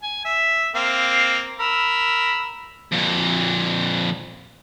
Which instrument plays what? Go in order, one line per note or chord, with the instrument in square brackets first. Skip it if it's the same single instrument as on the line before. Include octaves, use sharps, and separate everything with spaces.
[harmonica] G#5
E5
A#3 C4 F5
A#4 B5 E6
[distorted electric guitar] F2 A#2